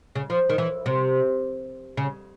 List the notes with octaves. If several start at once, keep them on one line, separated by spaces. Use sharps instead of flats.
C#3
F3
D#3
E3
C3
C#3